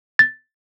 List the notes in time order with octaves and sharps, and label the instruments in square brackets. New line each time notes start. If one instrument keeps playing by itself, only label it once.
[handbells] A6